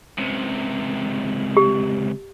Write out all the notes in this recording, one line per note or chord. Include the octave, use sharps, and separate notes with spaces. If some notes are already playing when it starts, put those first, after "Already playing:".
C#2 C3
G4